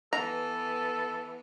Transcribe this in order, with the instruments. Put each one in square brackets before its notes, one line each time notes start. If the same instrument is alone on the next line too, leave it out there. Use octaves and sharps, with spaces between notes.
[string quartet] E3 B3 [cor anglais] A4 [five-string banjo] A#5